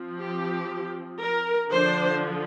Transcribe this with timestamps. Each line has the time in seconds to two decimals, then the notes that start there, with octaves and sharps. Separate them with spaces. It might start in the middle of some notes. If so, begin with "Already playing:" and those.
Already playing: F3 C4
0.18 G4
1.20 A#4
1.71 D3 F3 D4 C5